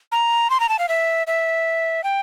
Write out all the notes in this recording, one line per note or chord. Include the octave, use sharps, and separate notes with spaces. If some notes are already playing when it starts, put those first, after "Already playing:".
A#5
C6
A#5
A5
F5
E5
E5
G5